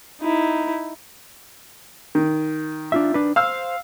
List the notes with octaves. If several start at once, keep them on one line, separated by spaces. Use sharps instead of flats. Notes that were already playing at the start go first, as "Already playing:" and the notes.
D#4 E4
D#3
D4 F4 E5
D4 B4
C5 F5 E6 F6